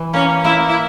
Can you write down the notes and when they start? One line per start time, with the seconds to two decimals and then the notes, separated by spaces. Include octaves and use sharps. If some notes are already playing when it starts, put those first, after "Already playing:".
Already playing: E3
0.13 A#3 C#4
0.44 A#3 E4
0.69 E4